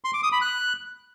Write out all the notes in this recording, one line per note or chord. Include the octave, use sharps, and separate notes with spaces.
C6
D6
D#6
B5
F#6